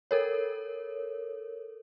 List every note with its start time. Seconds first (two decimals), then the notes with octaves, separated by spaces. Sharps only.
0.11 A4 A#4 C#5